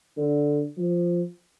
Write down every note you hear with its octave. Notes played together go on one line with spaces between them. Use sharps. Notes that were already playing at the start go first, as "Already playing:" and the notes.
D3
F3